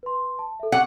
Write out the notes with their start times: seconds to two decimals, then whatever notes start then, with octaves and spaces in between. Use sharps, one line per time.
0.03 B4 C6
0.39 A5
0.60 A4 E5
0.72 F#5 C#6 D6 E6